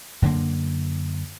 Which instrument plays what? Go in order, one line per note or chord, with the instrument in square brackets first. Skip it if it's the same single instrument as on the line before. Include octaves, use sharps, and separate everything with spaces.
[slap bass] F#2 D3 A#3